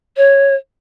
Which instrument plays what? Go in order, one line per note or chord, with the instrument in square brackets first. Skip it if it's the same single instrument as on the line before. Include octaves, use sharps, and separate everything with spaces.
[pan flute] C#5